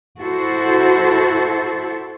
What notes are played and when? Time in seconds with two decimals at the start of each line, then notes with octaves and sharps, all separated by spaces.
0.22 E4 F#4 A4 C5